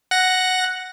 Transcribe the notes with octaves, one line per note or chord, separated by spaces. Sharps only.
F#5 A#6